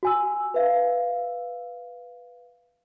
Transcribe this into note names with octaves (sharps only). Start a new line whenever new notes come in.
F#4 G#5 E6
B4 E5 F5